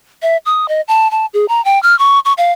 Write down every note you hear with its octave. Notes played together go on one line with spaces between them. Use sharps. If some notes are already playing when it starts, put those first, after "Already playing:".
E5
D#6
D#5
A5
A5
G#4
A#5
G5
F6
C#6
C#6
F5